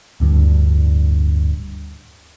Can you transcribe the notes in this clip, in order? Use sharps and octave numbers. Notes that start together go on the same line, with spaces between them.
D1 D2 G2